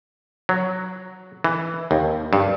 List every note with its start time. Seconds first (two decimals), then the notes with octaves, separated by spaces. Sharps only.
0.49 F#3
1.44 E3
1.91 D#2
2.33 G2